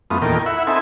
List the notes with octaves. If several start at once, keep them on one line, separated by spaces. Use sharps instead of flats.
F#2 A3 B3 F4 D#6
E2 A#2 D#3 A4 A#4 G5
E4 E5 F#5
C4 D#4 E4 A4 E5 G#5